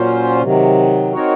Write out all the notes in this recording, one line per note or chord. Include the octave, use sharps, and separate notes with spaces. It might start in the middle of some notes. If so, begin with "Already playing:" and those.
Already playing: A#2 F#3 C#4 F4 C5
C3 D#3 F#3
C4 D#4 F#4 A#4 C#5